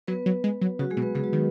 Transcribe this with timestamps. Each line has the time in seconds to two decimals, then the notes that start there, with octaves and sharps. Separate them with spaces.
0.07 F#3 B3 B4
0.26 F#3
0.44 G#3
0.61 F#3
0.79 C#3 F#3 F#4
0.90 G#3 G#4
0.97 B2
1.02 B3 B4
1.15 C#3 G#3 G#4
1.24 F#3 F#4
1.33 D#3